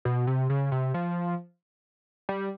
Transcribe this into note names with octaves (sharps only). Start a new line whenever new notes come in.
B2
C3
C#3
C3
F3
G3